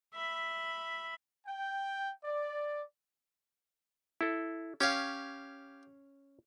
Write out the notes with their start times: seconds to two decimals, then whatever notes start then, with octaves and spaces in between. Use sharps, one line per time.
0.14 E5 B5
1.46 G5
2.24 D5
4.21 E4 A4
4.81 C#4 G4 C#5 F5